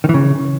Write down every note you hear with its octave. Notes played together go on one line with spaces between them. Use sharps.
D#3
E3
C#3